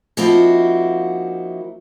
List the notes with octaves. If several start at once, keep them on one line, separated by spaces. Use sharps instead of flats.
F3 A#3 C4 D#4 E4 F#4